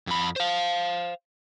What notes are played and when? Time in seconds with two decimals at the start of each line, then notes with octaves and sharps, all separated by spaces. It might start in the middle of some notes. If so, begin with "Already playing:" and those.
0.07 F2 B5
0.36 C5 F5